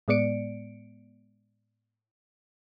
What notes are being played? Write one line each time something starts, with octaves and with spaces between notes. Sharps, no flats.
A2 G#3 B3 D5 C#7 D7